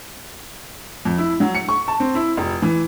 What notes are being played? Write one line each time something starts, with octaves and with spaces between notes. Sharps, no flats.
F2
E4
F#3
C#7
C#6
A5
C4
E4
F1
E3